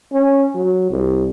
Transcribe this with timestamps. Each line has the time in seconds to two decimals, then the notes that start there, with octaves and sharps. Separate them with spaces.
0.13 C#4
0.55 F#3
0.91 C2